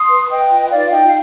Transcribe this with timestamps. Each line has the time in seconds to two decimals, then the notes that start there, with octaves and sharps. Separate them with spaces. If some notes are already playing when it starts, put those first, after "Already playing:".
Already playing: C6 D#6
0.08 B4
0.29 B4 D#5 G5
0.50 F4
0.62 G5
0.70 D#4 D5 F5
0.91 D#4 D#5 G5
1.07 F5